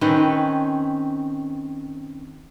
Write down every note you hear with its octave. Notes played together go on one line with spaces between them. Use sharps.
D#3 C4 C#4 B4